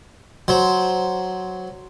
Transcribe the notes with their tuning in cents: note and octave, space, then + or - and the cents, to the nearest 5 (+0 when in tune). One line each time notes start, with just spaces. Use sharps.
F#3 +0 C5 +0